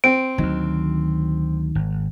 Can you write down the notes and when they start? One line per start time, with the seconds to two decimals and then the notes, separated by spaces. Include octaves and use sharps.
0.04 C4 D7
0.38 D2 D#3 F#3
1.75 G#1